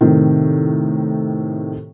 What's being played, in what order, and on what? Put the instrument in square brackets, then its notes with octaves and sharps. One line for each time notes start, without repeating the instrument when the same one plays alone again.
[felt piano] A2 C3 D#3